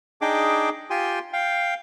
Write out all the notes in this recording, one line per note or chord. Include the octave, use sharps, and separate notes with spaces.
D4 D#4 G#4 D#5 G5 D6
F4 G4 G5 G#5 C6
F5 G5